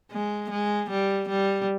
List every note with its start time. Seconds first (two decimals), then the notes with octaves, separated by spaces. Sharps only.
0.12 G#3
0.51 G#3
0.90 G3
1.29 G3